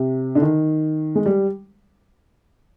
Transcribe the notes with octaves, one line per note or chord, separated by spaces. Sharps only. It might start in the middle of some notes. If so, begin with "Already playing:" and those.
Already playing: C3
D3
D#3
G#3
G3